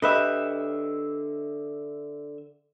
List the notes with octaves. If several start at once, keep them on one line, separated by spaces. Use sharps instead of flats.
D3 G4 B4 D#5 E5